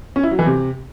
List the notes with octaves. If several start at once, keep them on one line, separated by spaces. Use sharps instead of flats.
C#4
E4
F#3
E3
C3